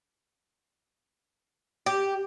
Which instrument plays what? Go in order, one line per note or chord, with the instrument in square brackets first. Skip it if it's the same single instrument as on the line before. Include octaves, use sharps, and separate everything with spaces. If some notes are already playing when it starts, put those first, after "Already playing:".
[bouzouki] G4